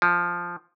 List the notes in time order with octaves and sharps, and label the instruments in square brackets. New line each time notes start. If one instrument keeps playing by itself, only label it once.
[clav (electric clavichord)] F3